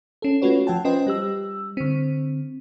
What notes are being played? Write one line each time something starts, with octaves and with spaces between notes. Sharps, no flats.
C#4 A4
A3 C#4 F4 F#4 B4 C#5
F3 F#5 G5 A5
C#4 F4 B4 C5 D#5 G5
G3 G4 E6
D3 C4